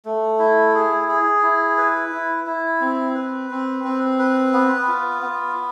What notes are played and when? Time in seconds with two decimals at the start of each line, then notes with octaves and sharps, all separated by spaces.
0.05 A3
0.39 E4
0.74 G#4
1.09 G#4
1.43 E4
1.78 B4
2.12 E4
2.46 E4
2.81 C4
3.15 B4
3.50 C4
3.84 C4
4.19 B4
4.53 B3
4.88 F4
5.23 B3